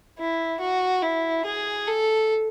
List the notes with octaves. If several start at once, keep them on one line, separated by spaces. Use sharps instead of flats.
E4
F#4
E4
G#4
A4